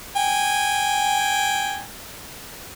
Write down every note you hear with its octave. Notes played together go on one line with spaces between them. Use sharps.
G5 G#5